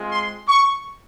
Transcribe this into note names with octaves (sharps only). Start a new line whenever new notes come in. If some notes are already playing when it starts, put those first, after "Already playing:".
Already playing: G#3 C4 F4
C6
C#6